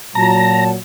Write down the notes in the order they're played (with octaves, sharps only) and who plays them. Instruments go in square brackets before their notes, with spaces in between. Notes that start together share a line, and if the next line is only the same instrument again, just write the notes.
[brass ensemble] A#2 F#3 [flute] A5 [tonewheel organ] A#5